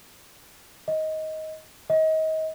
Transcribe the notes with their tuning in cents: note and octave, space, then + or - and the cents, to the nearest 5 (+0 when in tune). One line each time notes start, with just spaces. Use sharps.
D#5 +15
D#5 +30